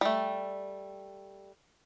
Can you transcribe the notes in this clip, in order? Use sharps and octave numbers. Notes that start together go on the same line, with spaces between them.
G3 A3